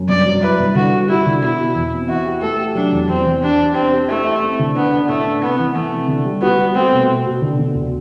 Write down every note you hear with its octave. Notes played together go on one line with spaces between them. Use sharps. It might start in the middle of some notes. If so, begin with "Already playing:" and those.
Already playing: F#2
G2 D5
F#3
E4 B4
G2
D3 F#4
G3
E4 F#4
D3
B2 E4
B2
E2
C4
E4 F#4
G4
A3 A4
G4
F#3 D4
E2
E2 C4
E2
D4 G4
G4
C4 D4
G4
A3 E4
E4
C4
D3
B3 D4
D4
A2 A3
D4
C3 B3
E3
E3 A3
C3
D3
G3
B3 F#4
G3
A3 C4
B2
B2
B2
D3
D3
D2